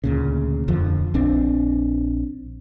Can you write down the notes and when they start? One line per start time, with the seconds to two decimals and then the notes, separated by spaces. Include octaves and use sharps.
0.04 D2 A#2 C#3
0.68 D#1 F2 D3 F3
1.14 A#1 C4 D4